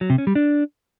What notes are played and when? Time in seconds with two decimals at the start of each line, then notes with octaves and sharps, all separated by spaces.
0.01 F#3
0.10 C3
0.18 C#4
0.27 G3
0.35 D4